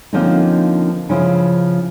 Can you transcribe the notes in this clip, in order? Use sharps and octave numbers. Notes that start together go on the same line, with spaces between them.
D3 F3 A#3 C4 C#4 D#4
C#3 F3 E4 C5